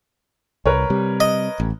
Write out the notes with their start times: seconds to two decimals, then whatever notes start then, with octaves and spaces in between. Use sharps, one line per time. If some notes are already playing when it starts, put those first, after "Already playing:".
0.65 C2 A#4 B4 C#5
0.90 C3 G3
1.20 D#5
1.60 A1